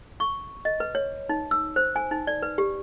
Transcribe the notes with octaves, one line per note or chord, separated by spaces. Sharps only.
C#6
D#5
B4
C#5
D#4
E6
C5
G#5
D#4
D5
B4
G4